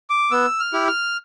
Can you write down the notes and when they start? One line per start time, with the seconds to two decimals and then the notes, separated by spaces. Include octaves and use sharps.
0.10 D6
0.31 B3 E6
0.60 F6
0.73 E4 G4
0.88 F6